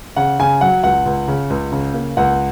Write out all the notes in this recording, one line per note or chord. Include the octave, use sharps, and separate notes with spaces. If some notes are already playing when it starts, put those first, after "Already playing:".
C#3 F#5
C#3 G#5
F#3 F#5
C#2 F#5
C#2
C#3
C#2
C#3
A#3
C#2 F#5